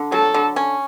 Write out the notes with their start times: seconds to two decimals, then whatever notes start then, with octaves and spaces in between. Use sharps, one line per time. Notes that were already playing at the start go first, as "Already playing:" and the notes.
Already playing: D3
0.12 F#3 A4
0.34 D3
0.56 C#4